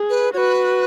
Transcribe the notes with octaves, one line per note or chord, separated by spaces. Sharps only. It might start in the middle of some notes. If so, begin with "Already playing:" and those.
Already playing: G#4
B4
F#4 B4 C#5